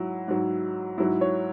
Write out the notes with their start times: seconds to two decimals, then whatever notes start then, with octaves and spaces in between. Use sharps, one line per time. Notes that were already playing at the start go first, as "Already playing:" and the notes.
Already playing: G#2 F#3 E4
0.28 G#2 F#3
0.98 G#2 F#3 E4
1.21 C#5